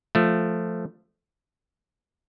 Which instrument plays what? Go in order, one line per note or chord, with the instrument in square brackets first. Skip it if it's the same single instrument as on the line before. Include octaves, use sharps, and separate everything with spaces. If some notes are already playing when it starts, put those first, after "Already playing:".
[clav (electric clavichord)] F3 A3